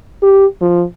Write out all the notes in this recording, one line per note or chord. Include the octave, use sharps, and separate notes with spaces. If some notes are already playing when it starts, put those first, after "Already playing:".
G4
F3